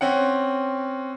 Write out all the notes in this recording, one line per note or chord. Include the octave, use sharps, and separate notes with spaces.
C4 C#4 F#5